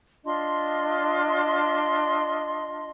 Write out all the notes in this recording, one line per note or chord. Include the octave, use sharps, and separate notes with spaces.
D4 F4 D#5 C6